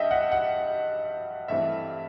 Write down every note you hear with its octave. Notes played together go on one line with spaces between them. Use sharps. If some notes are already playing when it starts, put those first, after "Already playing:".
Already playing: G2 G4 D#5 E5
F#5
F#5
G2 E3 A3 C4 E5